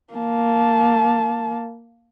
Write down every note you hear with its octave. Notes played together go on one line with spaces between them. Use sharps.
A#3 A5